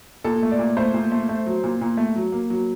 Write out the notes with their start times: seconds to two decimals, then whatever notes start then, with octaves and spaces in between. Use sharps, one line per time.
0.24 A#2 A4
0.43 A3
0.51 D5
0.59 A#2
0.77 A3 C5
0.94 A#2
1.12 A3
1.29 A3
1.46 F#3
1.64 A#2
1.81 A#2
1.97 A3
2.16 F#3
2.32 A#3
2.50 F#3